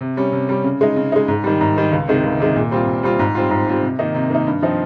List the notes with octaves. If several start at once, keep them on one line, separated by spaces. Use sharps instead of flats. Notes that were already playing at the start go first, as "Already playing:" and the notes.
C3
G3 C#4
C3
G3 C#4
C#3
G#3 D#4
C#3
G#3 D#4
G#2
D#3 G3
G#2
D#3 G3
C#2
C3 D#3 G#3
C#2
C3 D#3 G#3
A#2
G3 C4 F4
A#2
G3 C4 F4
G#2
G3 C4 F4
G#2
G3 C4 F4
C3
D#3 A#3 D#4
C3
D#3 A#3 D#4
G2
F3 C4 D#4